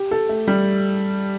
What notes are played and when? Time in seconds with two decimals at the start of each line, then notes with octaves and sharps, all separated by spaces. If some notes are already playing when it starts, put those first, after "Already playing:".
Already playing: G4
0.11 A4
0.29 A3
0.48 G3